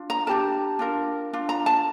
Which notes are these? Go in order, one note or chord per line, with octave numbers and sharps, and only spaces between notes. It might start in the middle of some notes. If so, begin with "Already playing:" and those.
Already playing: D4 F4
A#5
D4 G4 A#4 A5
D4 F4 A#4
D4 F4
A#5
A5